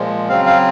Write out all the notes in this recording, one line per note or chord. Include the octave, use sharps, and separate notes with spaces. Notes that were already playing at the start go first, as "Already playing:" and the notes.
Already playing: A#2 F3 G#3
C#3 F#3 C4 F5
F5